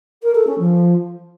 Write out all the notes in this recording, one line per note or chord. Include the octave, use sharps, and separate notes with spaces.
A#4
A4
C#4
F3